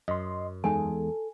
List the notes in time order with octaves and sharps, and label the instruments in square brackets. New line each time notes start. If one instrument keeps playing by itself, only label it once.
[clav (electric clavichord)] F#2 [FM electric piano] D#5 C6
[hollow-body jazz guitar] E2 G#3 D#4 [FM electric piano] A4 [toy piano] G#5